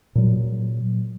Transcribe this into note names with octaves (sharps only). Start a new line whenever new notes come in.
A#2 F#3